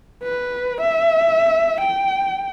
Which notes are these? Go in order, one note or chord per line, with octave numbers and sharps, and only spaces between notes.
B4
E5
G5